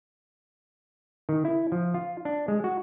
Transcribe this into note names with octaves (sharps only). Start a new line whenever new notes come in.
D#3
E4
F3
F4
D4
G#3
F#4